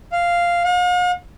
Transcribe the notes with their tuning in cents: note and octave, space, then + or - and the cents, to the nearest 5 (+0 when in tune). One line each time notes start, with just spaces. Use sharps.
F5 -5
F5 +45